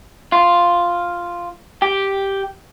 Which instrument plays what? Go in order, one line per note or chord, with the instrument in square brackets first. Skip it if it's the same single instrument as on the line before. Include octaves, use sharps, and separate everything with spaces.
[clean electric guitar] F4
G4